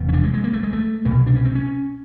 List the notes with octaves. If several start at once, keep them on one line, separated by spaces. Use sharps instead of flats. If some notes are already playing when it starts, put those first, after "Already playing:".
Already playing: F1 E2 B2
C#4
D4
G#3
G#3
A#3
A3
G#3
A3
C2 B2 A#3
D4
C#4
C4
C#4